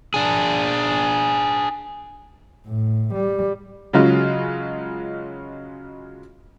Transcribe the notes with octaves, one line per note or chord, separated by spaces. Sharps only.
D4 G#4
A2
G3
C#3 F#3 G#3 F4